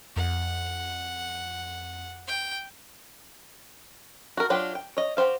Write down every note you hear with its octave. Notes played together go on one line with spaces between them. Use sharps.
F2 F#5
G5
F#4 A#4
F#3 D4 F4 G4
G5
C#5 D#5
F#4 G4 C5 F5